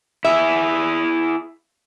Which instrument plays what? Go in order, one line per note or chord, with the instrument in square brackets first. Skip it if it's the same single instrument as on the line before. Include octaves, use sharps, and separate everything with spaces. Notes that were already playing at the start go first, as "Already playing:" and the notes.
[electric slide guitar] E4 G#4 [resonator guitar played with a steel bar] E5